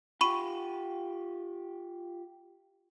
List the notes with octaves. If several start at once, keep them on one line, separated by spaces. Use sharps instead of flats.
F4 G4 B5 C#6 D#7